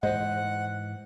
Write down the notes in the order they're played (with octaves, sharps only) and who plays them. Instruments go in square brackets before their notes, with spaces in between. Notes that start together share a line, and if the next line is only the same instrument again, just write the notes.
[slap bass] G#2 E3 [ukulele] C5 D#5 [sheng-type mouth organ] F#5